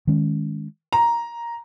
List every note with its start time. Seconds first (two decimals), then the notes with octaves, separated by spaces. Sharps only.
0.07 D#3 G#3 C#4
0.92 A#5